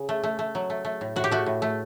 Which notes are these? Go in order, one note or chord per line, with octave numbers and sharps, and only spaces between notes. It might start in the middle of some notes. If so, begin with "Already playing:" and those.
Already playing: C#3
A3
A3
A3
F#3
A3
A3
A2
A2 F#4
G4
A3 F#4
A2
A3